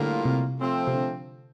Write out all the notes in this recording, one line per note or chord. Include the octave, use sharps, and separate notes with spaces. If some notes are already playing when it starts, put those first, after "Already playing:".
Already playing: A2 D3 G3 A#3 F4
C3
F3 A3 C4
C3
D3